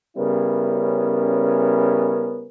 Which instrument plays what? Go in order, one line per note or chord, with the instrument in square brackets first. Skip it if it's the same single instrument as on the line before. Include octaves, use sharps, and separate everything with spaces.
[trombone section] C#3 G3 B3 C#4 E4 A#4